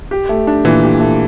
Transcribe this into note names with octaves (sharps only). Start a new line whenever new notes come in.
G4
A3
D4
A#2 E3
G4
A3